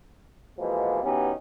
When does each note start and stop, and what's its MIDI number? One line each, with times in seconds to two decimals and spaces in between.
0.58 1.03 47
0.58 1.03 52
0.58 1.03 53
0.58 1.03 56
0.58 1.03 58
0.58 1.03 59
1.03 1.32 47
1.03 1.32 52
1.03 1.32 59
1.03 1.32 61
1.03 1.32 63
1.03 1.32 67